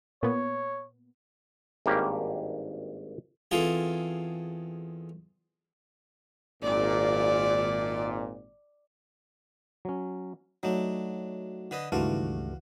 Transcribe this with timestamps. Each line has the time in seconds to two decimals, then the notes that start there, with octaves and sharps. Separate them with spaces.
0.23 A#2 B3 C#5
1.86 G#1 G2 A#3 C#4 G4
3.51 E2 C4 F4 G#4 A4
6.63 G#1 A#2 D5
9.85 F#3 C#4
10.63 F#3 A3 D4 D#4
11.71 D3 B4 D#5
11.92 C#2 G2 D#3 E3 A3 F#4 F5 A5